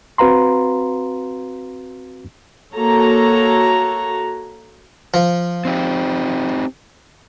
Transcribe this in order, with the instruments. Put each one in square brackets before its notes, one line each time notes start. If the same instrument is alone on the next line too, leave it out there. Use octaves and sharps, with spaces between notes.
[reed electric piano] C4 F#4 B4 F5 A#5 C6
[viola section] A#3 F#4 A4 C#5 A#5
[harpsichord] F3
[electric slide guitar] C4 D#4 G4